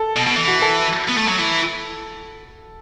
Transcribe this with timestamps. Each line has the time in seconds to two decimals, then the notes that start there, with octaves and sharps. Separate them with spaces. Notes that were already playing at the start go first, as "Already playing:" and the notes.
Already playing: A4
0.16 B2
0.26 B2
0.36 E3
0.47 F#4
0.62 A4
1.09 B3
1.18 A3
1.28 F#3
1.39 E3